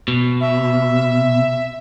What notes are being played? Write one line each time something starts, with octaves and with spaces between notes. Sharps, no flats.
B2
E5